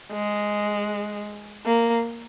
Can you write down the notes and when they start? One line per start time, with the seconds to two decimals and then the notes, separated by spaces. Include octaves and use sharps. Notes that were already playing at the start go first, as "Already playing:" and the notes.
0.12 G#3
1.66 A#3